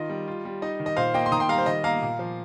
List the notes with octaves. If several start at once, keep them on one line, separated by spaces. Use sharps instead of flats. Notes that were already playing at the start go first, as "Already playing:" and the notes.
Already playing: D#3 F4 D#5
G3
F4
G3
D#4 D#5
D#3
D#5
A#2 C5 F5
A#3 D#5 G5
C6
D#3 A#5 D#6
G5 C6
G3 F5 A#5
C5
D#3 D#5
A#3 F5 A#5
A#2
F3